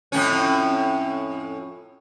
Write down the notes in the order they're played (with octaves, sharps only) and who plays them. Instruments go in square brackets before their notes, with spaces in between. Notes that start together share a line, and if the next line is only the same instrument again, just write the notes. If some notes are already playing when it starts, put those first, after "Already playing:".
[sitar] F2 A2 C#4